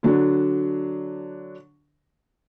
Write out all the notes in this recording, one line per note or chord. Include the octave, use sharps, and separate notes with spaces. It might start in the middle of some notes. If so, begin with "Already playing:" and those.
D3 F#3 D4